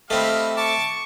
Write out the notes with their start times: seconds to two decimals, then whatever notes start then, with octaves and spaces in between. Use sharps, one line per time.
0.10 A3 C4 G4 D#5 F5 B5
0.57 A5 C#6 D6